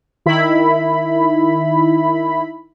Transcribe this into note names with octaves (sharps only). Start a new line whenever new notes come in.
D#3 E4 B5